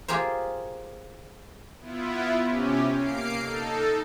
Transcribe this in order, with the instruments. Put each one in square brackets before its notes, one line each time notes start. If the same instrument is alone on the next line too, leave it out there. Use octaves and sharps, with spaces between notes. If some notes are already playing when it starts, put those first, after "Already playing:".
[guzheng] F4 G4 G#4 A#4 C5
[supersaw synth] B3 E4 F4
C3 C#4 G4
A#3 F5 C7 D7
D#4 A4